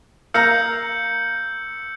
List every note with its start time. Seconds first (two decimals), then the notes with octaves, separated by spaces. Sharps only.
0.34 A#3 F5 A#5 E6 G6 C#7